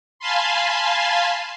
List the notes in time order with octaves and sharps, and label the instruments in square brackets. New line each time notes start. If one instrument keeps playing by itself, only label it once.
[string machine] F5 G#5 A5 B5 C6